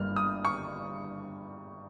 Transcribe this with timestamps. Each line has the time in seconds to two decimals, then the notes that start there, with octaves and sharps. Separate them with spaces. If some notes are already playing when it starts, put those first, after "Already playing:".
Already playing: G1 G2 G3 A#3 F6
0.16 D#6
0.45 C#6